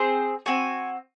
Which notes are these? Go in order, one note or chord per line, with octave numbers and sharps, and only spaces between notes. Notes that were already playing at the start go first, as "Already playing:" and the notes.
Already playing: C4 G#4 C5
C4 F#4 G#5